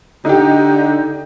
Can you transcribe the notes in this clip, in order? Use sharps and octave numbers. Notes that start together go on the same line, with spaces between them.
D3 D#4 G4